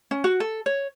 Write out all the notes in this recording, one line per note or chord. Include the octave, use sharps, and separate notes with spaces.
C#4
F#4
A4
C#5